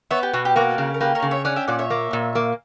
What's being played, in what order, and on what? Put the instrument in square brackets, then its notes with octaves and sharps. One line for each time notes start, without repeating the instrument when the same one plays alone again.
[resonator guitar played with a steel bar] B3 [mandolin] C#5 E5
[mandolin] G4
[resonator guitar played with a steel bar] B2 [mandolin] F#4
[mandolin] G4
[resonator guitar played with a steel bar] A#3 [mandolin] F#4 A#4
[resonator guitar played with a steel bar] C#3
[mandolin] A#4
[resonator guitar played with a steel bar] A#3 [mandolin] G4 B4
[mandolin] A#4 C#5
[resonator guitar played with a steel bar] C#3
[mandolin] C#5 E5
[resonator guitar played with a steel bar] C#4 [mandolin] D5 F#5
[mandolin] E5 G5
[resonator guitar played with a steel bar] A#2 [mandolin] D5 F#5
[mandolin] C#5 E5
[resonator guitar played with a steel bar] A#3
A#2
A#3